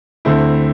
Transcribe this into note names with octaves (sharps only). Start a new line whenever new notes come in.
D2 D3 A3 C4 E4